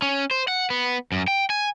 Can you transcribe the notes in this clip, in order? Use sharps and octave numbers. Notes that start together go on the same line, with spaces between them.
C#4
C5
F#5
B3
F#2
G5
G#5